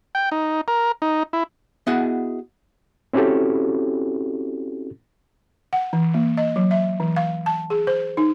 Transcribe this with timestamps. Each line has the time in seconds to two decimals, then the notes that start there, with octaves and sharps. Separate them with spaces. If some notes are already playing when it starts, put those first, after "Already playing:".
0.15 G5
0.32 D#4
0.68 A#4
1.02 D#4
1.33 E4
1.87 B3 E4 F#4 G#4 D#5 F#5
3.13 C4 C#4 E4 F#4 G4 A4
5.73 F#5
5.93 E3
6.14 A#3
6.37 D#5
6.56 F#3
6.71 E5
7.00 E3
7.16 F5
7.46 A5
7.70 G#4
7.87 C5
8.17 D#4